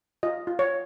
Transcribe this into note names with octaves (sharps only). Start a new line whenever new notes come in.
F4 D#5
F4
C#5